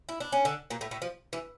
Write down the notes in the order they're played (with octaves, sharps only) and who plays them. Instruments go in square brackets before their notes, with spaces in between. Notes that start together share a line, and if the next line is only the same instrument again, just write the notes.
[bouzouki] E4
D4
C#4
D3 D4
A#2 A#3
A2 A3
A2 A3
F3
E3